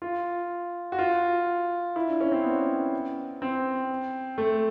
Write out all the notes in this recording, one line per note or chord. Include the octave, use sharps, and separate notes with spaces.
F4
F#4
F4
E4
D4
C#4
C4
B3
C4
A3